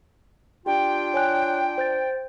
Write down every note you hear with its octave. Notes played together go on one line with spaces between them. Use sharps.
D4 F4 G4 G5
C#5 G#5 F#6
C5 G6 A6